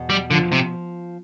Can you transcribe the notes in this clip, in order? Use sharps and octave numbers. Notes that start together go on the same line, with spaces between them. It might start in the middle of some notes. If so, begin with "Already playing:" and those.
Already playing: E2 B2
G3
D3 F3
C3